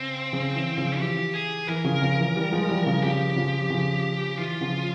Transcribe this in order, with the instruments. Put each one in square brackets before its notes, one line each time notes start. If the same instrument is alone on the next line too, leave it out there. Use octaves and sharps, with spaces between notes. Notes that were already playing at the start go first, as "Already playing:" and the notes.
Already playing: [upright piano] C#3 [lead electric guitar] C4
[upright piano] C#3
E3
C#3 F3
[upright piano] E3 [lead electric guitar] G4
[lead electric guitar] G#4
[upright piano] E3 [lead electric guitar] A#4
[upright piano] C#3 F3
C#3 F3
E3
E3 G3
F3 G#3
E3 G3
C#3 F3
[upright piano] C#3 F3 [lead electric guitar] G4
[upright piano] C#3 F3
C#3 F3
[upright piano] E3 [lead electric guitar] F4
[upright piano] C#3 F3